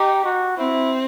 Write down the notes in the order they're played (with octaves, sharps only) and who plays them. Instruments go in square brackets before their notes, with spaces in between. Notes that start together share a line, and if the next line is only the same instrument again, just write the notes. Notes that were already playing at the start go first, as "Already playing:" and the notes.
Already playing: [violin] D#4 [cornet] G4
[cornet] F#4
[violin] C4 [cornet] E4